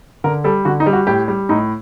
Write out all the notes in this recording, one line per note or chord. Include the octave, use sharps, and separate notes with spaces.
D3 A#4
G3 A4
D3 F#4
D#4
G3
F#4
A2 G4
G3
A2 D#4